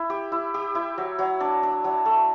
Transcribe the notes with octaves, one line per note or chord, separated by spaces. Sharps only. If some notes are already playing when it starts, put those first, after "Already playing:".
Already playing: E4
G4
E4
G4
E4
F#3
F#3
D4
D4
F#3
A3